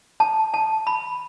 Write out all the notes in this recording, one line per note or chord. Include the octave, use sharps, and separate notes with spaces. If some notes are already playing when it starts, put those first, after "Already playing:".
A5
A5
B5